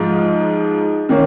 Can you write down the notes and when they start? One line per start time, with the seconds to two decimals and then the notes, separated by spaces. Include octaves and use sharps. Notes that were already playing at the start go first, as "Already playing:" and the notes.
Already playing: G#2 F3 G#3 F4
1.09 D#3 A#3 C#4